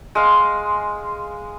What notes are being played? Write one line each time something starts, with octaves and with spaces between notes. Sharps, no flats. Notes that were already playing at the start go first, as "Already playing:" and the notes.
G#3 F5